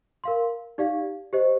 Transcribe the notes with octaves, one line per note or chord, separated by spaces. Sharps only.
A#4 F5 C6
D#4 G4 D5 F5
G4 C5 D#5